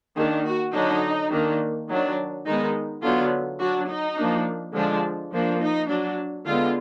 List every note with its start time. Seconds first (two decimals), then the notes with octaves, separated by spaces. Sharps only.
0.17 D#3 A#3 D4 G#4
0.46 F#4
0.74 D3 F#3 D4 D#4
1.31 D#3 A#3 D4
1.89 D#3 F#3 D4
2.46 D#3 G#3 B3 D#4
3.03 D3 F#3 B3 F4
3.60 F#3 D4 F#4
3.88 D#4
4.18 F3 A#3 D4
4.75 D3 F3 G#3 D4
5.32 F3 A#3 D4
5.61 D#4
5.89 F#3 D4
6.46 D3 G#3 B3 F4